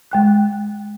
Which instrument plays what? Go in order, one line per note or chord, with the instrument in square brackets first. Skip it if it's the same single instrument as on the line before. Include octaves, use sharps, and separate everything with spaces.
[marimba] G#3 G5 F#6